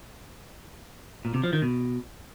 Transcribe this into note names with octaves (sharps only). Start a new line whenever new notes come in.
A#2
C3
F3
D#3
B2